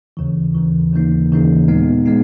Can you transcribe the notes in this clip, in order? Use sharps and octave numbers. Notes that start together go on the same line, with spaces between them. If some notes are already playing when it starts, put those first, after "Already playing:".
D#2 C#3 E3
D#2 C#3 E3
D#2 C#3 E3 A#3 D#4
D#2 C#3 E3 A#3 D#4
A#2 G#3 B3 D#4
G#3 B3 D#4